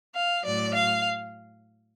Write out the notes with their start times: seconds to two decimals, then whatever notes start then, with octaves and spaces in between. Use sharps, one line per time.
0.14 F5
0.43 A2 F#3 D5
0.73 F5